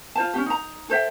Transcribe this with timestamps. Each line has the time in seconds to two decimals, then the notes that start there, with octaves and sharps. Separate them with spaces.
0.15 F4 C5 A5
0.33 C#4 D4 G4
0.46 D#4 A#5
0.89 A4 C5 E5 G5